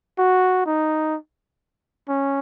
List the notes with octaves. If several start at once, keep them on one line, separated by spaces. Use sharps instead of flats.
F#4
D#4
C#4